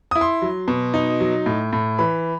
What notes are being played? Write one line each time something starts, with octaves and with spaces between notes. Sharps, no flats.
E4 D#6
C6
F#3
B2
D#4
F#3
A2
A2
E3 B5